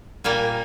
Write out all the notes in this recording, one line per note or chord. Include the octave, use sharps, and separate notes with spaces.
A#2 G3 A#3 G#5